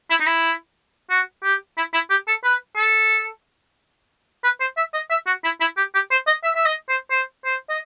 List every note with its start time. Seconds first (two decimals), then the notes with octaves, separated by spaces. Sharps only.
0.10 E4
0.20 D#4
0.26 E4
1.10 F#4
1.44 G4
1.77 E4
1.94 E4
2.10 G4
2.27 A4
2.44 B4
2.77 A4
4.44 B4
4.60 C5
4.77 E5
4.94 D#5
5.10 E5
5.27 F#4
5.44 E4
5.60 E4
5.77 G4
5.94 G4
6.11 C5
6.27 D#5
6.44 E5
6.56 E5
6.66 D#5
6.89 C5
7.11 C5
7.45 C5
7.70 D#5